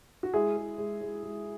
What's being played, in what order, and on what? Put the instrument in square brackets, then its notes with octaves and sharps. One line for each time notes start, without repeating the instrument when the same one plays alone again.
[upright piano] F#4
G#3 E4 G#4
G#3
G#3
G#3
G#3